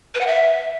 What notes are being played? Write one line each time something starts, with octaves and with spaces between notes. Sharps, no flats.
B4
F#5
E5